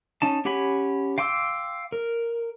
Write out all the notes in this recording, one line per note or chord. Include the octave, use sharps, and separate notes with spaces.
C#4 D#4 A5
C#4 G4 F#5 G#5 B5
F5 G5 C6 D6 E6
A#4